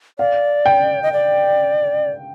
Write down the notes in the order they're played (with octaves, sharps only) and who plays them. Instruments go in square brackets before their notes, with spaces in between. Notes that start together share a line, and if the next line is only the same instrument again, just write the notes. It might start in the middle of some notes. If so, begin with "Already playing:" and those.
[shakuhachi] D5 [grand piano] F5
[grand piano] G5
[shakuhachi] D#5
D5